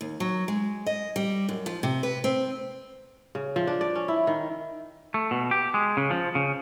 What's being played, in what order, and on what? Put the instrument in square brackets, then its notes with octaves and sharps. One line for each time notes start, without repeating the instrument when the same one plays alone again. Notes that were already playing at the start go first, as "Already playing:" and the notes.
[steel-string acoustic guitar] D#2
F#3
G#3
D#5
G3
F#2
F3
C3
B4
C4
[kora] C#3
F3
D4
D5
C#4
E4
D#3
[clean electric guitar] A3
B2
G4
G#3
C#3
F3
C#3